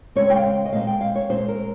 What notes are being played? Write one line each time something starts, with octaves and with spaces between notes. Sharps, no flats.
C#3 G#3 C4 C#5
G5
F5
G5
D#5
A#2 G#3 C4 F5
G5
F5
C#5
A#2 G#3 C4 C5
A#4